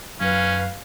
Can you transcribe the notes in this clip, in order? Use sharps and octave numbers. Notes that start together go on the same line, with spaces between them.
F#2 C#4 B4 F5